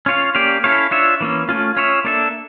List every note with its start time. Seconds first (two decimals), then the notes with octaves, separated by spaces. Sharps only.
0.06 C#4 F4 C#5 F5
0.35 A#3 C#4 G4 D5 F5
0.64 C#4 E4 A4 C#5 F5
0.91 D4 F4 C#5 E5
1.21 E3 A#3 C#4
1.49 A3 C#4 F4
1.76 C#4 F4 C#5 E5
2.04 A#3 D4 A4 E5